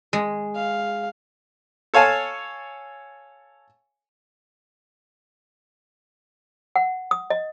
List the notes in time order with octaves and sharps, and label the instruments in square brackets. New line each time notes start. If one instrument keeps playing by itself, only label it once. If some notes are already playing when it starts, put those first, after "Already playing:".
[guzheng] G#3
[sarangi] F5
[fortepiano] A4 C#5 F5 G#5 A5
[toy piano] F#5
D#6
D#5